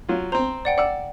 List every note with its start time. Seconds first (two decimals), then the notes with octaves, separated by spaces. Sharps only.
0.09 F#3 F4
0.32 C4 C5 A#5
0.65 D5 F#5 G5
0.78 D5 F#5 E6